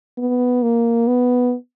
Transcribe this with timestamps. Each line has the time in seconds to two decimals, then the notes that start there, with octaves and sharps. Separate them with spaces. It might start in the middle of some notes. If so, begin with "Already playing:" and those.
0.18 B3
0.63 A#3
1.07 B3